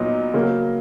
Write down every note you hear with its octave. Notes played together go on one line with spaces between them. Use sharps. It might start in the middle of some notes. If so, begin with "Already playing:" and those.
Already playing: A#2 F#3 B3 D#4
C#3 F#3 A#3